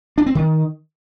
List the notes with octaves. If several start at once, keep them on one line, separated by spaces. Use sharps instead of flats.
D4
C4
D#3